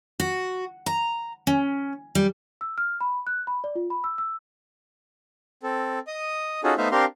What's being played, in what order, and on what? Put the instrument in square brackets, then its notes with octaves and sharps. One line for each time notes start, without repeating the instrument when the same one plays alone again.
[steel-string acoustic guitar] F#4
A#5
C#4
G3
[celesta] E6
F6
B5
F#6
B5
D5
F4
B5
E6
E6
[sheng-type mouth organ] C4 A4
D#5 D#6
C#4 D#4 F4 F#4 G#4 A4
A3 B3 D#4 C5 E5 F5
C4 D4 G4 A#4 F5 C6